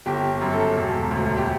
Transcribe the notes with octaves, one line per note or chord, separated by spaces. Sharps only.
G1 G4
F#2
A4
E1
D2
G4